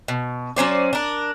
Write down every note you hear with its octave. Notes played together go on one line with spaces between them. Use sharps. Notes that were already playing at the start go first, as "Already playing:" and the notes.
B2
F#3 C#4 C5 D5
D4 A#4